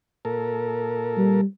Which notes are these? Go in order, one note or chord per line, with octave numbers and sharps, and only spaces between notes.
A#2 A4 A#4
G3